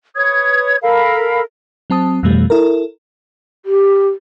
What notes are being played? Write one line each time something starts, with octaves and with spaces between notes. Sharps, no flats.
B4 C#5 D#6 G#6
A4 A#4 F5 B5
F#3 C4 A5 D#6
F2 B2 E3 G3 A3
E4 A4 A#4
G4